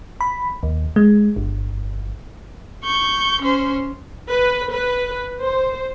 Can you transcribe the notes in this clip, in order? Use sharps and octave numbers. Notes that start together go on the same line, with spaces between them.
B5
D#2
G#3
G1
C#6 G6
C#4 C5
B4
B4
C5